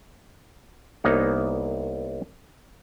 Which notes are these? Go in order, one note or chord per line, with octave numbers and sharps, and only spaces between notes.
C2 A#3 B3 D#4 C#5